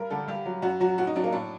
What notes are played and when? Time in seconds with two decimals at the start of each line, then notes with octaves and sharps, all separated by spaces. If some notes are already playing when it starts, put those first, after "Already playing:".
Already playing: G2 A#4
0.10 D3 G3 A4
0.28 G2 G4
0.46 F#3
0.62 F#2 F#4
0.80 F#3 F#4
0.98 A2 F#4
1.07 D#4
1.16 F#3 D4
1.24 A#3
1.32 A2 D4